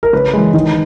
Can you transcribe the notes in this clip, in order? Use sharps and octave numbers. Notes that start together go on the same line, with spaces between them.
A#4
C#3 B4
E3 G#3
D#3